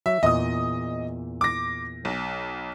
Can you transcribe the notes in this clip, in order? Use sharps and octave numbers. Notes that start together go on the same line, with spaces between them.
F#3 E5
E2 A#2 D#5 D#6
D6 A#6
B1